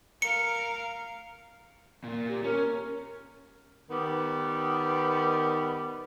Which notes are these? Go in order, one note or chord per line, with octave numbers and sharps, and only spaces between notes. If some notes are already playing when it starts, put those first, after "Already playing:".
A#4 F5 C#7
A#2 A#3
G4
C#4 A#4
D#3 G3 B3